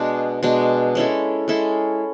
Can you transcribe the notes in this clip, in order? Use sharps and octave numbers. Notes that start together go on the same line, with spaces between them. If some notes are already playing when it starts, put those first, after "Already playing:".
Already playing: B2 G#3 D4
B2 G#3 D4
G#3 C#4 E4 A4
G#3 C#4 E4 A4